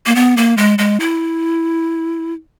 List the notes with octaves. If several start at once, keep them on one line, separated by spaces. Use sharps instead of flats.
A#3
B3
A#3
G#3
G#3
E4